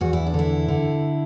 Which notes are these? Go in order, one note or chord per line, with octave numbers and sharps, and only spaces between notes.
E2 F#4
E4
D4
D3 E4
D3